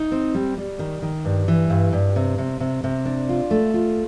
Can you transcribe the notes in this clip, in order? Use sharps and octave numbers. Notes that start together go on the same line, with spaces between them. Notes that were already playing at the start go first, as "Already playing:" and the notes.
Already playing: D#4
C4
G3
G3
D#3
D#3
G2
E3
G2
G2
C3
C3
C3
C3
D4
F4
A3
F4